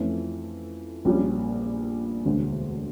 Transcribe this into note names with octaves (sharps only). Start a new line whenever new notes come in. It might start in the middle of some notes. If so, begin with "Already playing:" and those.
Already playing: F2 E3 A3 C#4 F4
A#1 A#2 G3 C#4
E1 D2 D3